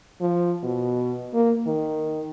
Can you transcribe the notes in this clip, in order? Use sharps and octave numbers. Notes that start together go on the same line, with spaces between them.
F3
B2
A#3
D#3